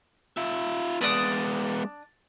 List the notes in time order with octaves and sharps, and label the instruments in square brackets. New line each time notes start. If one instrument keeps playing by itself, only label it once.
[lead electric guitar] F4 E5
[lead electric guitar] G#3 B3 [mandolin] D4 D5 D#6